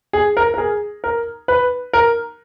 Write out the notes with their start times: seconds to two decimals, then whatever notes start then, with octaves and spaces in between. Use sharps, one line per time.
0.13 G#4
0.37 A#4
0.54 A#4
0.58 G#4
1.04 A#4
1.48 B4
1.93 A#4